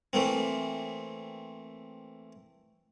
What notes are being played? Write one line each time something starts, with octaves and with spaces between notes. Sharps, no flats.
E3 A3 A#3 C4